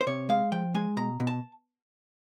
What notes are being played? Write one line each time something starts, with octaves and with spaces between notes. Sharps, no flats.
C5
C3 C#5
G#3 F5
F3 G5
G#3 G#5
B2 A#5
B2
A5